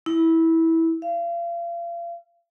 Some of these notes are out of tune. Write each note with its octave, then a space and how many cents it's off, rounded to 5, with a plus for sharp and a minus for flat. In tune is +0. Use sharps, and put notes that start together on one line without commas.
E4 -15
F5 -35